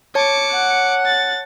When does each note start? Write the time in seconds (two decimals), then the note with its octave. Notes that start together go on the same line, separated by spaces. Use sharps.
0.15 C#5 A5 D6 C#7
0.51 F#5
1.06 A6